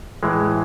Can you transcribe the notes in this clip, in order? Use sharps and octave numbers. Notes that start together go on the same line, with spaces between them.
A2 E3 G#3